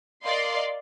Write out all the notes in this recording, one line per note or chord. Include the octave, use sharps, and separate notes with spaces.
A#4 D5 D#5 F5 C6